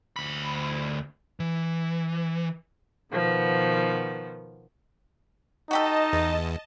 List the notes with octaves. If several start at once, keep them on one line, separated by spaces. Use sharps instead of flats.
D2 B5
E3
B2 D#3 F3 B3
D#4 F#4 G4 A4 D#5 A5
E2